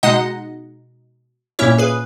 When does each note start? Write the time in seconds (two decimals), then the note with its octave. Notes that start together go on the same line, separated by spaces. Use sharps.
0.03 B2 G#3 D#4 D#5 F#5
1.59 A#2 A#3 C#4 E4 C#5 E5
1.78 G#4 B4